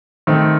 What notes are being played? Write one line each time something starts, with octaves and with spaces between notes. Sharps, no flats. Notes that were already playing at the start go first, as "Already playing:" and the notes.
D#3 A3 C4